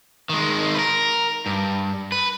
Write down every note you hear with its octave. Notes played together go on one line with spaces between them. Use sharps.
D#3 G#3
A#4 B4
G2
B4